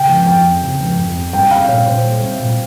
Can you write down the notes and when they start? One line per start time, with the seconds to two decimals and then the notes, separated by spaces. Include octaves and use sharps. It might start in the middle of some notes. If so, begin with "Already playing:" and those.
Already playing: C#3 G5
0.09 F3
0.27 F2 G5
0.45 C4
0.62 C#3
0.80 F3
0.98 F2
1.16 C4
1.33 G3 G5
1.51 C4 F5
1.68 A#2 C#5
1.86 A#2 C5
2.04 G3
2.22 C4
2.40 A#2